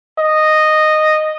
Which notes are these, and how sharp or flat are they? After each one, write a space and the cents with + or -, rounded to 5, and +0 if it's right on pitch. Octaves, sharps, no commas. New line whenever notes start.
D#5 -10